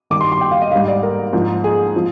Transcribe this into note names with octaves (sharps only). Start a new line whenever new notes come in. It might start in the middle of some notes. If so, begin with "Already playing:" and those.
G2 D#3 G3 A#3 D6
C6
C6
G5
F5
D#5
G#2 G3 A#3 F5
D5
A#4
G#2 F3 A#3
G#4
F3